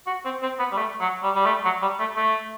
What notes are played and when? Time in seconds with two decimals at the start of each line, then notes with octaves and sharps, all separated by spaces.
0.07 F#4
0.25 C4
0.43 C4
0.59 B3
0.72 G3
0.77 A3
1.01 F#3
1.23 G3
1.35 G3
1.46 A3
1.65 F#3
1.82 G3
1.99 A3
2.17 A3